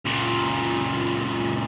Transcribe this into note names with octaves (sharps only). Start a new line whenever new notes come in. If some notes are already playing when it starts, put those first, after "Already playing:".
C#2 A#2